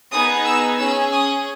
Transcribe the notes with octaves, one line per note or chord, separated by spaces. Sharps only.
B3 D#4 G#4 D#6
E6
C#4 G#4 E6
D#6